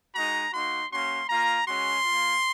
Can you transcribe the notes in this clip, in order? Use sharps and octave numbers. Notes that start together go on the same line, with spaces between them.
G#3 D#4 F#4 A#5
A#3 D#4 F#4 C6
A#3 C#4 F#4 C6
A#3 F4 A#5
G#3 C#4 F#4 C6
A#3 F4